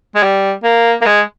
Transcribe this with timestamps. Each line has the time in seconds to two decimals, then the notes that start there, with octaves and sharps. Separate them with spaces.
0.15 G#3
0.23 G3
0.64 A#3
1.02 A#3
1.06 G#3